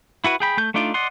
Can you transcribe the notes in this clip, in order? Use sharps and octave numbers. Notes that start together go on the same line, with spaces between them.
E4 F#4 B4
G#4 G5 B5
A3 G6
A3 D4 D#4 F4 D5
D5 D#5 F#5 C6